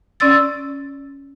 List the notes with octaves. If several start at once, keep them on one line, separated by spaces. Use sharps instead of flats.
C#4 D5 C6 E6 A6